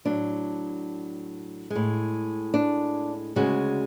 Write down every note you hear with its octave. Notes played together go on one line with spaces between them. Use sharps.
A2 F#3 D4
G#3
A2
D4
D2 C#3 G#3 F#4